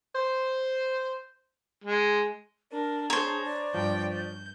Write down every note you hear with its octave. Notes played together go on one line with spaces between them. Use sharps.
C5
G#3
D4 A#4
G#4 C5 C#5 A#5
D5
G2 F3 G5 G6
G6